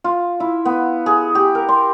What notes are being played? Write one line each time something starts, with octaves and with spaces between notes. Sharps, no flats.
F4
E4
B3
G#4
G4
A#4
C6